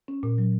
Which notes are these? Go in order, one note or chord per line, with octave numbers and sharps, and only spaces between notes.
C#4
A#2
F#3